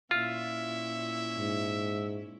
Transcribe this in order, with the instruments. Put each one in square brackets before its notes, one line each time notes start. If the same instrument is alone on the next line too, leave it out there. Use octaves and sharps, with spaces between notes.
[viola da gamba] A#2 C#4 E4 [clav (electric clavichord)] F4 [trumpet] E5
[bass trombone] G#2